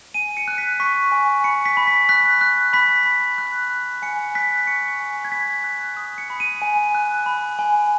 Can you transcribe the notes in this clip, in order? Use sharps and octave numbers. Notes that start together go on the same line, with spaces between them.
G#5 D#7
C#7
F#6
B6
C#6 B6
G#5
B5 C#7
B6
B5
B6
F#6 B6
F#6
B5 B6
B5
F#6
F#6
G#5 C#7
F#6 B6
C#6 C#7
G#5
G#6
B5 B6
F#6
D#6
C#7
B5
D#7
G#5
F#6
B5
G#5